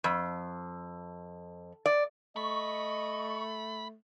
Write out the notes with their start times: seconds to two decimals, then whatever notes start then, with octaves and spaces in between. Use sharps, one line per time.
0.04 F2
1.86 D5
2.36 A3 D#5 B5 C#6